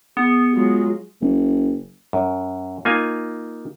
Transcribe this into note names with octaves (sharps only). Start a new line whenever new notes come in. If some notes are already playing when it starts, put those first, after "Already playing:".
B3 G#4
F#3 G#3 F4
F#1
F#2
A#3 D#4 F4 G#5